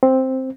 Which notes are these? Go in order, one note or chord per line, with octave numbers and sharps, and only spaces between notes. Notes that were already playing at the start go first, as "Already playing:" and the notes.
C4